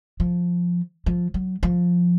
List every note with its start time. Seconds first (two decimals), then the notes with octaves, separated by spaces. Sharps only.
0.20 F3
1.06 F3
1.34 F#3
1.63 F3